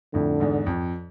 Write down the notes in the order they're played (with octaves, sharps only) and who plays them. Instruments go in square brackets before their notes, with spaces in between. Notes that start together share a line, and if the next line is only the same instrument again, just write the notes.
[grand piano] F2 A2 [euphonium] D3
[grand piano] E2 G#2
F2